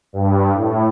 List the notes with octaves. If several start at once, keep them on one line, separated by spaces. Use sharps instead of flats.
G2
A2